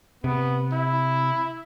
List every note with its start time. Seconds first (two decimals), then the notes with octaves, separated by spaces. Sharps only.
0.24 C3 B3
0.73 E4